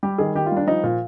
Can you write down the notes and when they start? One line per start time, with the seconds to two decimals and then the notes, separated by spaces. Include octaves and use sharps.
0.03 G3 G4
0.18 D#3 G#4
0.35 D#3 G4
0.46 F4
0.52 G3 D4
0.67 F3 D#4
0.84 A#2